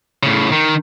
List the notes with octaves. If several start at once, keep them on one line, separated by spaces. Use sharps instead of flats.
A2 C#3
D#3